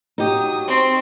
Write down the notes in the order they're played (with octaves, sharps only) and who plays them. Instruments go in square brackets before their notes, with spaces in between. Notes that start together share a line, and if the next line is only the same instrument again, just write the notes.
[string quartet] F#3 D#6 [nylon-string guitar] D#4 G4
[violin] C4 [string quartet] C6 C#6